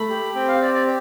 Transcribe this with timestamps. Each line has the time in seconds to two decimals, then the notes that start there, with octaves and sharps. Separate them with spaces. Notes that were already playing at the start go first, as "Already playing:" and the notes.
Already playing: A3 B5
0.10 G4
0.35 C4 G5
0.48 F5
0.61 G4 D5
0.74 D5